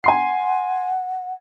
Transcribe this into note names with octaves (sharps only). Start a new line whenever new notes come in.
F#5 G#5 C6 C7